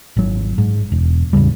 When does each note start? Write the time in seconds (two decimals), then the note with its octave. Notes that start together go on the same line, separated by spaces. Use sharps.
0.17 G#1 F#3
0.58 G#2
0.92 E1
1.33 A1 E2 C#3 G3